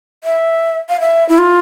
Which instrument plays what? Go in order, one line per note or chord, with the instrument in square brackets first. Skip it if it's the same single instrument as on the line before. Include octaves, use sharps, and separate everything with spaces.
[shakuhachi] E5
F5
E5
E4
F4